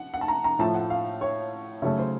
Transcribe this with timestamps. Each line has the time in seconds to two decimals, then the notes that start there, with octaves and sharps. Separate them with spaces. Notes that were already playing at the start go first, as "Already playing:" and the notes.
Already playing: F#5
0.14 F#5
0.21 A5
0.28 A#5
0.44 A#5
0.59 A2 F3 A3 A5
0.75 F#5
0.90 F5
1.21 C#5
1.82 C#3 F#3 A3 C#5
1.99 C5